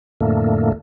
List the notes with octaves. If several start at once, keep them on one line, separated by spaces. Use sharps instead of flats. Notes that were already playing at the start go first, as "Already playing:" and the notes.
F2 A2 D3 A3 A#3